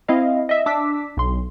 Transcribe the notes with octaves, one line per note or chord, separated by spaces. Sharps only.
C4 E4 D#5 F5
D#5 E5
D4 D6 E6 B6
B1 C6